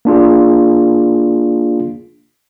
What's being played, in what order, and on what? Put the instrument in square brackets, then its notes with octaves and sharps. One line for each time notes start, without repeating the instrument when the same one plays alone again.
[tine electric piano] A#3 D4 F4 G#4